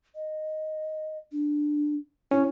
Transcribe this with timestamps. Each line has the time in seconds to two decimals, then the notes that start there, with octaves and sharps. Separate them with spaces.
0.15 D#5
1.32 D4
2.31 C#4 E4